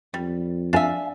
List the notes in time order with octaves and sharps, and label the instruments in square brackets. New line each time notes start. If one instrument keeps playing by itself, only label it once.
[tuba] F2 [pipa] G3
[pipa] D4 E5 [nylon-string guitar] F5 G#5